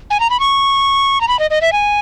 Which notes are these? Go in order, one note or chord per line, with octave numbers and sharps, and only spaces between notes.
G#5
A#5
B5
C#6
A#5
B5
D#5
D#5
E5
G#5